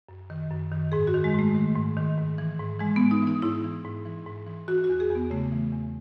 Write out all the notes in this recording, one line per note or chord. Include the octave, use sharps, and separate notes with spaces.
F#2
D#3
F#2
D#3
G#2 G#4
F#4
D#3
G#3
G#2 A3
D#3
G#2
D#3
G#2
E3
G#2
E3 G#3
G#2 B3
D#4
E3 D#4
G#2 E4
E3
G#2
E3
G#2
E3
E3 F#4
F#4
E2
G#4
E2 B3
C#3 A3
E3
E2